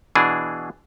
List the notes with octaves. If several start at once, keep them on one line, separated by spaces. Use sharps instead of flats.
B2 E3 D4 G#4